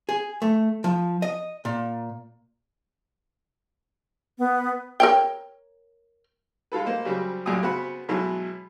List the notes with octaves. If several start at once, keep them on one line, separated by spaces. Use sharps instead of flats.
G#4
A3
F3
D#5
A#2
B3
A#4 C#5 G5
G#3 F4 A4 B4
A#3 C5 D#5
C#3 F#3 G3 C4
A1 F#2 A#2 G3 G#5 D#6
C#3 B3 C4 F#4 F#5 B5
B2 E3 F#3 G#3 B3